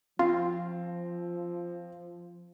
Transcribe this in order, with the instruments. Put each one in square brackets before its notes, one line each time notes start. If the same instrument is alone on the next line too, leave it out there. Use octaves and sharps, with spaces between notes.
[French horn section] F3 [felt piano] C4 [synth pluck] F4